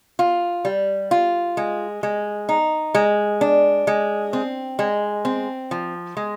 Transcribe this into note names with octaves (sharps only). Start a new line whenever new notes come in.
F4
G3
F4
G#3
G#3
D#4
G#3
D4
G#3
C4
G#3
C4
F3
G#3